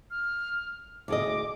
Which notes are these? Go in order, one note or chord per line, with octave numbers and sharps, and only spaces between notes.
F6
D2 G#4 D#5 D6